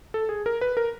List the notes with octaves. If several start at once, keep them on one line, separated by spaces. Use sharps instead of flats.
A4
G#4
A#4
B4
A#4